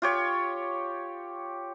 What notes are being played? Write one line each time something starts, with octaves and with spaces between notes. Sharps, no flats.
F4 G4 C#5